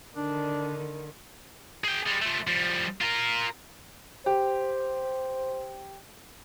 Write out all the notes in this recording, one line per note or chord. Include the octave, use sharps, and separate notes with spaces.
D3 D#3 D4
G#4 G5
G3 G#3
F3 A3
F3 G3
F4 A#4
G4 C5